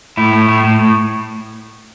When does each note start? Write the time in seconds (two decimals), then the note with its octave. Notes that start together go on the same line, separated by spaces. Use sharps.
0.17 A2 E4
0.33 A2
0.49 A2
0.64 A2
0.79 A2